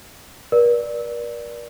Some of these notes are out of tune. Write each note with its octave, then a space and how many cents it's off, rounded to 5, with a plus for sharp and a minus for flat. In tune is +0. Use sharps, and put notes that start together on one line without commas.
A#4 +40 D5 +0